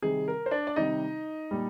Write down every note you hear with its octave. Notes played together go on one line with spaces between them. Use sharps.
C3 D#3 G3 G#4
A#4
C5
D4 D5
D5
C3 D#3 G3 D#4 D#5
A#2 G3